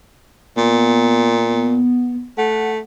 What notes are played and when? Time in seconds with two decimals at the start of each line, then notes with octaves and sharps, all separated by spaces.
0.57 A#2 B3
2.38 A3 F#5